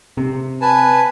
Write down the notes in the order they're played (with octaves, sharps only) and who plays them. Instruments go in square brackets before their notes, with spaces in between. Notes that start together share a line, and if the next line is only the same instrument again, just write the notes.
[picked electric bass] C3
[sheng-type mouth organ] B4 G#5 A5